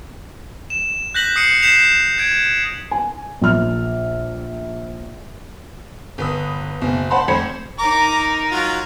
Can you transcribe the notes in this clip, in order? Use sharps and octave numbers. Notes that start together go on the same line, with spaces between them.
E7
F#6 G6 A#6 B6 F#7
D#6 C7 C#7 D#7
G6 B6 C7 E7 F7
G6 G#6 D7
G#5
A#1 F6
G1 B4 D#6
F#1 B2
C5 F#5 A5 B5 C6
F2 A3 C5 B5 G#6 C#7
D#4 A#4 A#5 D6
F#3 F4 F#4